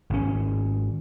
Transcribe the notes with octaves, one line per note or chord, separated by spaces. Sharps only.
G#1 C#4